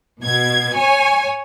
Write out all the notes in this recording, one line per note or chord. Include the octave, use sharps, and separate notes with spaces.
B2 G#6
C#5 G#5